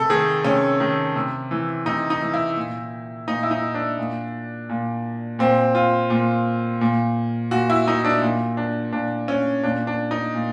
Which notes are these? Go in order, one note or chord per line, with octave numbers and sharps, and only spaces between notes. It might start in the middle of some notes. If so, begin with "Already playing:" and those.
Already playing: C3 A4
D#3 G#4
C3 C#4
D#3
C3
E3
C3 D#4
D#4
E3
E4
A#2
A#2 D#4
E4
D#4
D4
A#2
A#2
A#2 C4
F4
A#2
A#2
A#2 F#4
E4
D#4
D4
A#2
D4
A#2 D4
C#4
A#2 D4
D4
D#4
A#2